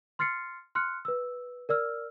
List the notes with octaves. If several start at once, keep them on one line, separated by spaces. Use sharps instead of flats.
C6 F6 A6 C7 C#7
C6 F6 F#6 C#7
B4 E6
A#4 D5 E6 F6